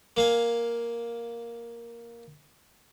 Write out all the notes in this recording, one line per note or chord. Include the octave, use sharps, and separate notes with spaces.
A#3 F5 G#5